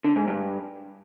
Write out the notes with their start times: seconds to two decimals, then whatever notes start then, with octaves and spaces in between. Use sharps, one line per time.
0.04 D3
0.16 G#2
0.28 G2